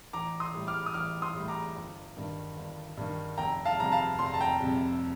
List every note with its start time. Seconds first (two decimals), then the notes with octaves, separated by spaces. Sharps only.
0.13 A1 A#5 D6
0.40 C6 D#6
0.54 A2 G3
0.67 D6 F6
0.86 D#6
0.94 A1 D6 F6
1.22 C6 D#6
1.35 A2 G3
1.48 A#5 D6
1.76 G1
2.17 G2 D#3
2.57 G1
2.97 G2 D#3
3.38 F1 G5 A#5
3.65 F5 A5
3.78 F2 C3 G3 A#5
3.92 F5 A5
4.19 F1 C6
4.26 A#5
4.34 A5
4.41 G5 A#5
4.60 F2 C3 G3